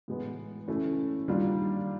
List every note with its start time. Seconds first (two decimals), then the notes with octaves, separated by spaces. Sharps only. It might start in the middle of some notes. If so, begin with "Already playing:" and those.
0.08 A2 E3 G#3 B3
0.68 E3 A3 C#4 E4
1.28 D#3 G3 A#3 D4 F4